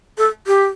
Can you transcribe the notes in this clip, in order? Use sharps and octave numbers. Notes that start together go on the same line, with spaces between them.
A4
G4